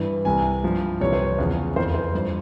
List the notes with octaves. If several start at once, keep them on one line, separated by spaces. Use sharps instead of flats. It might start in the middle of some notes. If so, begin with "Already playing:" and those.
Already playing: G2 E3
C2 C3 E3 G#5
G2 F3
C2 C3 E3 C#5
C5
C#5
E2 C#3 F3
F2 E3 C5
C5
G2 F3